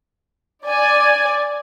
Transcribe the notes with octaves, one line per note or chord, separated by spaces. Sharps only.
D5 G#5